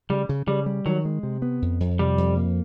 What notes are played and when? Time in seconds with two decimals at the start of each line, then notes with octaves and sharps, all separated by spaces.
0.10 C#3 G3
0.29 C#3
0.47 C#3 G3
0.66 G3
0.86 D#3 F#3
1.05 G#3
1.23 C3
1.42 B3
1.62 F2
1.80 F2
1.99 C3 G3
2.18 F2
2.37 A#3